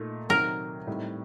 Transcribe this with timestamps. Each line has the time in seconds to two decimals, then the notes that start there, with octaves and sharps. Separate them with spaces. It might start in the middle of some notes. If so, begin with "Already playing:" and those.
Already playing: A#2 A3 D#4
0.29 C3 D#3 F#3 A#4
0.87 A2 G3 C4 D#4